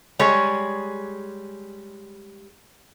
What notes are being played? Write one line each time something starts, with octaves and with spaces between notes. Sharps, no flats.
G3 G#3 G#4 C#5